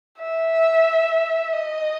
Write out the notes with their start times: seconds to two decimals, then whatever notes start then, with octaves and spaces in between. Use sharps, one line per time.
0.18 E5
1.53 D#5